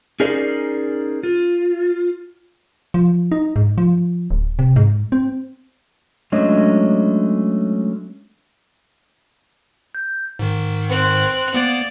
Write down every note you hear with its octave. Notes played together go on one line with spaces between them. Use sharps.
C#4 D#4 G#4 A#4 C5 D5
F4
F3
D#4
G#2
F3
D1
C3
G#2
C4
F#3 G#3 A3 C#4 D4 D#5
G6
G#2 D#3
C4 F#6
A#3 B3 D5